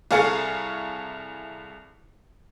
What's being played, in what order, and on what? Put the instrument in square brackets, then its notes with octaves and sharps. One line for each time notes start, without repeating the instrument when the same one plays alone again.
[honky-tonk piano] C2 G#4 A4 F5 C#6 C#7